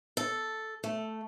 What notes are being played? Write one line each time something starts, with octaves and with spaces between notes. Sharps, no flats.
A4
A3